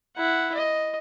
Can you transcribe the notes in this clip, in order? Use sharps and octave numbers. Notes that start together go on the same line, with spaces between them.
E4 F#5
D#5